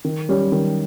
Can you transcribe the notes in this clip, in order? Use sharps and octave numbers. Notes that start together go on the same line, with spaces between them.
D#3
G3 C#4 G4
D#3